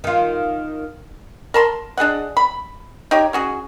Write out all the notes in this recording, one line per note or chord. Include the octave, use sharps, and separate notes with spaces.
D#3 F4
A#4 A5 B5 C6
D4 G#4 D#5 F#5
B5
D#4 G4 C#5
C#4 F#4 G#4